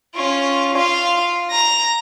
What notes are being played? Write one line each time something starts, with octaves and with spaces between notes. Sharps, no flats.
C#4 F4
F4 F5
A#5 A#6